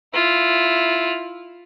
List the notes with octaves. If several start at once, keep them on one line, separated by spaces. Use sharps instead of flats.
E4 F4